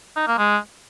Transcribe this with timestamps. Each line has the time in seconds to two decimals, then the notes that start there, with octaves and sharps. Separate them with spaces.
0.17 D#4
0.27 A#3
0.38 G#3